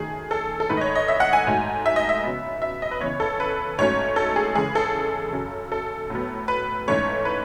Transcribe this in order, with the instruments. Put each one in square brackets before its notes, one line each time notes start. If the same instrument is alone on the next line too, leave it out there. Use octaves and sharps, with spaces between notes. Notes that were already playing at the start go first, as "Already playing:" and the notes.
Already playing: [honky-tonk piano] F#2 D#3 A3 G#4
A4
A4
G#2 D#3 A3 B4
D#5
C#5
D#5
E5
F#5
G#5
G#2 F#3 A3
E5
D#5
E5
C#3 F#3 B3
E5
D#5
B4
C#3 E3 B3 C#5
A4
B4
G#2 F#3 A3 C#4 C#5
A4
G#4
C#3 E3 G#3 G#4
A4
F#2 C#3 F#3 C#4
A4
A2 F#3 B3
B4
G#2 E3 A3 C#4 C#5
B4